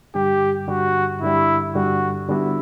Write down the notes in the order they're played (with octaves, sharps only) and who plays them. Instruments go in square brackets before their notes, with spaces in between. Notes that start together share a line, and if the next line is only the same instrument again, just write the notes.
[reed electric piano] G2 D3 G3 [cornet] G4
[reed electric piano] G2 D3 G3 [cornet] F#4
[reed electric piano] G2 D3 G3 [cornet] E4
[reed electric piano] G2 D3 G3 [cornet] F#4
[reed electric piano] D3 G3 B3 D4 F#4 [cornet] E4